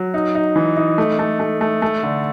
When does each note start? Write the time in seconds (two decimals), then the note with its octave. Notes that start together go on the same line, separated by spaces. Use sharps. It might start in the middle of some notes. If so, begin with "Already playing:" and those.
Already playing: F#3
0.14 D#4
0.35 D#4
0.56 E3
0.77 D#4
0.98 A3
1.19 A3
1.40 A3
1.61 A3
1.82 A3
2.03 D3